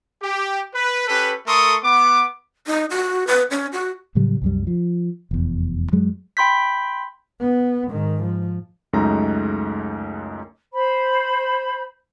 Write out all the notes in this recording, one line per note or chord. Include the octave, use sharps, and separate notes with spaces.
G4
B4
C#4 G4 A4 B4
A3 A4 A#4 C6 C#6 D#6
B3 D6
D#4
F#4
B4
C#4
F#4
A2 C#3 F#3 G3
C2 F#2 G3
F3
F1 E2
F#2 F#3 G#3
G5 B5 C6 G6 B6
B3
G#2 D#3
F3
C#2 F#2 G#3 A3 D#4 A#5
C5 B5